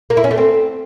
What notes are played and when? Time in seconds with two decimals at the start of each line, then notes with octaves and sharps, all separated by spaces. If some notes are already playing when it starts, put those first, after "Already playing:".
0.10 A#3
0.17 E4
0.24 C#4
0.31 A3
0.38 C4